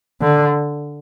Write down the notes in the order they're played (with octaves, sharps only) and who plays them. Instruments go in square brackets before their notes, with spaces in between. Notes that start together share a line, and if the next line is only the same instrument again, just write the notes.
[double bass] D3